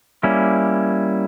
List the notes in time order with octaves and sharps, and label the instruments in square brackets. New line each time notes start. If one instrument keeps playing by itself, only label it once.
[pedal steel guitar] G3 A#3 C#4 E4